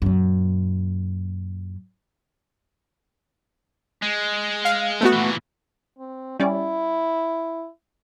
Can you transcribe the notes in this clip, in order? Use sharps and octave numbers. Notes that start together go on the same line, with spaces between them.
F#2 A#2
G#3
F5
A3 B3 F#4
A#2 E3
C4
G3 C#4 E4 D5